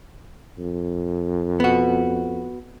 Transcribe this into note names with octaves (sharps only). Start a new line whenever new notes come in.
F2
B3 F#4